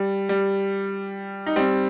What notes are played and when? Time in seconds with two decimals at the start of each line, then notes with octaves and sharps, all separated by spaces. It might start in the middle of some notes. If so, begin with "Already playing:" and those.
Already playing: G3
0.29 G3
1.47 D#4
1.56 G3 C4